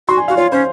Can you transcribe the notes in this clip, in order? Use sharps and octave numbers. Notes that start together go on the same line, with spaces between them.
F#4 C6
G#5
F#4 F5
F4 C#5
C#4 C5